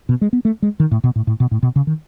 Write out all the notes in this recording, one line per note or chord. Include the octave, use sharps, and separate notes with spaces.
B2
G#3
B3
A3
G#3
D#3
A2
B2
A2
A2
B2
A2
B2
C#3
D#3